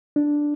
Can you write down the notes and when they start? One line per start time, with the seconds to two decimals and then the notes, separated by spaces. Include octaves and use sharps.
0.16 D4